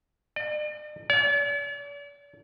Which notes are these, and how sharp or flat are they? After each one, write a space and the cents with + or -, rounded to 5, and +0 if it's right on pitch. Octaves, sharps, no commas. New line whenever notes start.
D5 +45
D5 -45